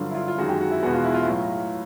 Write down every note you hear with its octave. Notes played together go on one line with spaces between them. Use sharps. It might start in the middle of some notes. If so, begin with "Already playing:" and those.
Already playing: G2 D3 F#3 F4
E4
F4
F4
F#2 D#3 G#3 F#4
G4
F#4
E4
E2 B2 G#3 F#4
F4
E4
F4
E4
A2 F#3 F4